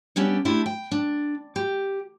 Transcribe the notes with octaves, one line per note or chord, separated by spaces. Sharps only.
G3 B3 C#4 D4 G4 E5
A3 D4 E4 F4 G4
G5
D4
G4